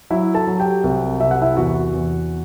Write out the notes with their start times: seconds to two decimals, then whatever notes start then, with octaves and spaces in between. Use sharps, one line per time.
0.10 F#3 E4 E5
0.34 A4 A5
0.47 F#3
0.59 G4 G5
0.84 C2
1.20 C3 E5
1.31 F#5
1.42 E4 E5
1.57 E2 F#4 F#5
1.94 E2